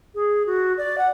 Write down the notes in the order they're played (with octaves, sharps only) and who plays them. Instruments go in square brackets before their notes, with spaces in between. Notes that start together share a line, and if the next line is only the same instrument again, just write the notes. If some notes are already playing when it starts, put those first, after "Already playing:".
[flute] G#4
F#4
D5
F#5